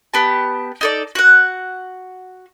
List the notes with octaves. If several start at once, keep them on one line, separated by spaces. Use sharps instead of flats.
B3 G4 A5
D#4 A4 D5
F#4 F#5